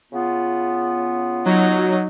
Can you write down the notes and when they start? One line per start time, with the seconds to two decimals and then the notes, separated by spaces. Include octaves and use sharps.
0.12 C#3 B3 F4
1.46 F#3 D#4